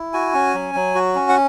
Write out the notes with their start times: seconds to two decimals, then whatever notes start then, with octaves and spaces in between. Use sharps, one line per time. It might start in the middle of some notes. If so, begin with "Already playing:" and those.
Already playing: E4
0.14 F#4 G#5
0.34 C#4
0.54 F#3
0.75 F#3
0.95 F#4
1.15 C#4
1.29 F#5